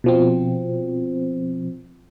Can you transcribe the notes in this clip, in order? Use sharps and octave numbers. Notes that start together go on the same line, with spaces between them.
B2 F3 C4